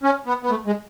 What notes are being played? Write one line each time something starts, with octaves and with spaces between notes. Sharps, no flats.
C#4
B3
B3
A3
G#3